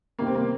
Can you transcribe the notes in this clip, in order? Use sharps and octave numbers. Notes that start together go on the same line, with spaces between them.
C3 D#3 G3 A#3
C4
A#3